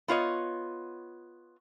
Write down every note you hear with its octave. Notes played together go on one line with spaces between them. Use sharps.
B3 F4 C#5 D#5